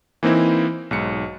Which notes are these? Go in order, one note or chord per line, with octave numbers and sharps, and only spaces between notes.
E3 A#3 C4 D#4 E4
B1 G#2 C#7